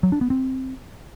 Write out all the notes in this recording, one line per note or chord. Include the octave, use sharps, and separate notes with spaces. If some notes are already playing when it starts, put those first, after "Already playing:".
F#3
D4
B3
C4